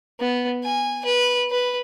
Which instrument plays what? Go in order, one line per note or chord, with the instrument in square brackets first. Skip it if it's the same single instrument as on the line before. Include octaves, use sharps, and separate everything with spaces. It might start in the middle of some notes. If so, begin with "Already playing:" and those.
[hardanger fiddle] B3
G#5
B4
B4